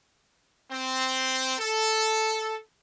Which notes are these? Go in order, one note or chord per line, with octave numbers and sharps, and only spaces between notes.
C4
A4